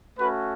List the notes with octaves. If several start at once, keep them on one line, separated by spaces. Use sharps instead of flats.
A3 C#4 F#4 B4